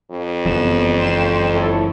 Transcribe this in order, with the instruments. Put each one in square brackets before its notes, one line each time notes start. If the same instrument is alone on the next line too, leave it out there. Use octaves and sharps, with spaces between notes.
[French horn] F2
[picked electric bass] F#1 E3 [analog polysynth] B3 E7
[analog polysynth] G5 C6 E7
E4 A4 C#5